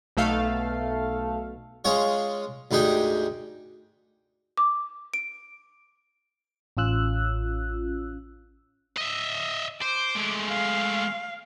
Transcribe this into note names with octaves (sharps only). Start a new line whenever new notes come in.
B1 B2 A3 A4 F5
G#3 C#4 F4 G#4 C#5
D2 G#2 D#4 G4 G#4 G5
D6
D7
A1 C#4 F4 E6 F#6
D#5 E5
C5 D6
G#3 A3
F5